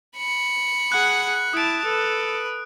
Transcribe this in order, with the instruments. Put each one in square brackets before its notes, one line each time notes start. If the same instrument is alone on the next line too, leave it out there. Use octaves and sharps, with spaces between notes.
[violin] B5 C#7
[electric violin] G#4 F#5 [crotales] F#6
[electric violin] E4 A5 [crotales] D#6 D7
[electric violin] A4 [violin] B4